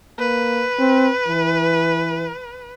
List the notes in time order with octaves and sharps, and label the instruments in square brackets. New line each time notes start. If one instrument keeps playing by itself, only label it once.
[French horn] A#3 [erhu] B4
[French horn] C4
E3